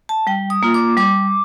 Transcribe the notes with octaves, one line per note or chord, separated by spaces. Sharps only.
A5
G3 G5
D#6
A#3 F4
D6
G3 D6